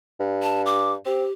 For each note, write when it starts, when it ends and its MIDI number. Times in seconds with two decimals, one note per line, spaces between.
0.20 0.95 43
0.43 0.62 81
0.66 0.92 86
1.06 1.24 60
1.06 1.32 67